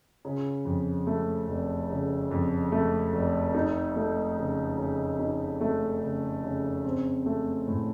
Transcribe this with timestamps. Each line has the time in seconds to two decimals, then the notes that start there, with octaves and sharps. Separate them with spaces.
0.25 C#3
0.65 F2
1.07 A3
1.48 F1
1.90 C#3
2.31 F2
2.72 A3
3.13 F1
3.55 D#4
3.96 A3
4.38 C#3
4.78 C#3
5.19 D#4
5.61 A3
6.01 C#3
6.44 C#3
6.85 C4
7.26 A3
7.68 A2